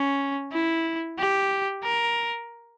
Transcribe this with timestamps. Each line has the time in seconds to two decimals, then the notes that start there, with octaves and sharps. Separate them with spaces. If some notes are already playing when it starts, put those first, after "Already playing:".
Already playing: C#4
0.52 E4
1.18 G4
1.83 A#4